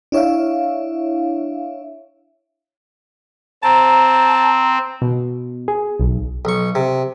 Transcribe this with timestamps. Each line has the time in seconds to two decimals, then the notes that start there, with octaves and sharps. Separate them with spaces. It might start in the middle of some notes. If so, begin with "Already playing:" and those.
0.12 D4 E4 C#5 E5 F5
3.63 C4 A5 A#5
5.02 B2
5.68 G#4
6.00 B1
6.45 B1 C#6
6.75 C3